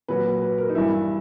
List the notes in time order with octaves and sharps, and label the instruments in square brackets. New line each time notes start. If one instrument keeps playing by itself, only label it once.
[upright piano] A#2 F#3 B4
B4
A#4
D#4
G2 E3 G3 E4